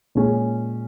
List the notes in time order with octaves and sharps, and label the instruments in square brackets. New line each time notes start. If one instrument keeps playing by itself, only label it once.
[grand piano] A#2 G#3 C#4 G#4